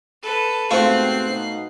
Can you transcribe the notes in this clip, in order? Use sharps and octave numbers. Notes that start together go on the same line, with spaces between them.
A4 B4
G#2 B2 A3 C4 F4 F#6 C7
B2 D#4